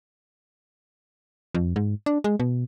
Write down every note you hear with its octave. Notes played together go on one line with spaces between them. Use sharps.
F2
G#2
D4
G#3
B2